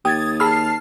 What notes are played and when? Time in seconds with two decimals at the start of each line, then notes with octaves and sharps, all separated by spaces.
0.05 D#2 G4 G5 D#6 G#6 A6
0.40 G#4 A5 B5 E6 F6 C7